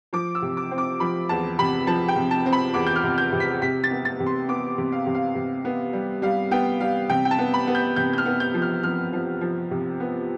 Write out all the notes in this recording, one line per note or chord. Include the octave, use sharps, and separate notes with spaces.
F3 D6
E6
C3
D6
C4
D6
F3 B5
E2 A5
C3 B5
F3 A5
G5
C3
A5
C4
B5
E2 D6
G6
F6
C3
G6
C3
B6
C3 B6
A6
B3
A6
C3
C6
B3 D6
C3
F5
C3
F5
C3
B3
G3
G3 F5
B3 G5
G3 F5
C3 G5
G5
A5
B3
B5
B3
G6
C3 G6
G6
F6
B3
G6
F3
F6
F3 F6
F3
F3
C3
B3